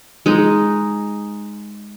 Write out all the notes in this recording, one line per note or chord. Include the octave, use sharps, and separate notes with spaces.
G#3 D#4